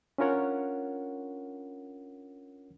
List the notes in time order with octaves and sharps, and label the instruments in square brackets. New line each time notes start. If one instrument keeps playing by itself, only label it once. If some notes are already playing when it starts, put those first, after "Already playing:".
[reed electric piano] C#4 D4 F4 A#4 C#5 F#5